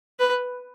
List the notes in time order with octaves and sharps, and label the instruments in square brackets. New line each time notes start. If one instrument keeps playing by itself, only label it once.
[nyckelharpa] B4